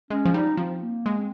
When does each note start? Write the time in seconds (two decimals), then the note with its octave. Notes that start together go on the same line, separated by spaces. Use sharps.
0.10 G#3 C#4
0.26 F3
0.34 G3 D#4
0.57 F3 C4
0.81 A#3
1.06 G#3
1.18 C4